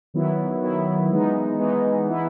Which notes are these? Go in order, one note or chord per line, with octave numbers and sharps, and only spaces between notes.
D#3 F#3 B3 E4
D#3 F#3 B3 E4
E3 G#3 B3 D#4
E3 G#3 B3 D#4
E3 B3 E4